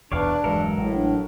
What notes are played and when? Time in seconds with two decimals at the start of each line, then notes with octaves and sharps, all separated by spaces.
0.12 D#1 B1 E2 D4 B4 C#5 D5 F5
0.44 E1 G2 E3 F#3 G#3 A4 A#4
0.76 A1 A2
0.95 D4